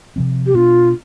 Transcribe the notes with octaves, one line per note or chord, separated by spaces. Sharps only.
C3 F3 C4
G4
B2 B3 D4 F4